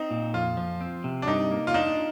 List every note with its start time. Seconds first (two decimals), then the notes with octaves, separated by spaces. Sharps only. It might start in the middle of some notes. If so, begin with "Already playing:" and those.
Already playing: C4 D#4
0.11 A#2
0.34 F2 F4
0.57 F3
0.81 C4
1.04 C3
1.22 D4
1.27 G2 D#4
1.51 A#3
1.67 F4
1.74 D4 D#4